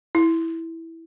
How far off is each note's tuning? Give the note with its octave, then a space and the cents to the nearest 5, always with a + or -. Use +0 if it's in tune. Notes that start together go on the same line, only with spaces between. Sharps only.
E4 -5